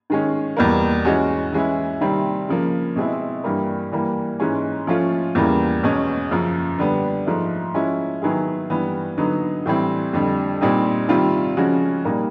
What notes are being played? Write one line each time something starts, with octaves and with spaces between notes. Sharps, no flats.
D#3 G#3 C#4
E2 B2 G3 A#3
E3 G#3 C#4 F#4
E3 G#3 C#4 E4
C3 D#3 G3 C4
C#3 F3 A#3
B2 G#3 C4 E4
G2 E3 G3 A#3
E3 G3 A#3
G#2 E3 G#3 C#4
F3 A3 C#4 F4
E2 C#3 E3 G3 A#3
E2 B2 G#3 C#4
F#2 C#3 F3
D3 G3 B3 D4
G#2 F3 A3
F3 G#3 C#4 E4
D#3 F#3 B3 E4 G#4
G2 E3 G3 B3
D3 F#3 B3 D#4
A2 E3 G3 C4
F2 D3 G3
A#2 G3 C4 D#4 G4
C3 D#3 G3 C4 F4
C#3 F3 G#3 C#4 F#4
A#2 G3 A#3 D#4